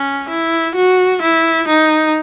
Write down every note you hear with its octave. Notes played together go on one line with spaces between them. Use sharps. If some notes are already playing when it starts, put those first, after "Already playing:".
Already playing: C#4
E4
F#4
E4
D#4